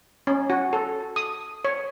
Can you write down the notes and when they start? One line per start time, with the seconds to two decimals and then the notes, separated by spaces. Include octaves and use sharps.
0.27 C#4
0.50 F#4
0.73 A4
1.16 D#6
1.65 C#5